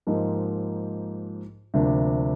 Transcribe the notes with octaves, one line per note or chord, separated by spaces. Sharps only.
G#2 F3 A#3 D#4 G4
D2 C3 F3 A#3 D4